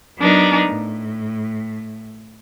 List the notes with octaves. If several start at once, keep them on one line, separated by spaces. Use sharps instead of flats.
F#3 B3 D4 D#4 A#4
A2